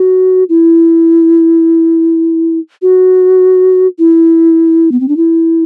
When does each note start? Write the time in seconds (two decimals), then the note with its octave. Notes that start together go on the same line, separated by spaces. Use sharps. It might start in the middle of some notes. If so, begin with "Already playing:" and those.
Already playing: F#4
0.49 E4
2.82 F#4
3.99 E4
4.92 B3
5.00 C4
5.08 D4
5.17 E4